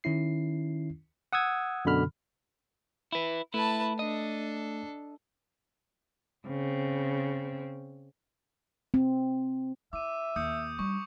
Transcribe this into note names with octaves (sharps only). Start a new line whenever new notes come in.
D#3 C#4 E4 C7
F#5 D#6 E6 G#6
F#2 B2 D3 B5 F6
E4 B4
A3 E4 B4 A5
D4 A4 D#5
C#3 C4
C4
E4 E5 D6 D#7
D#2 D#6 G6 C#7
G3 D4 C#6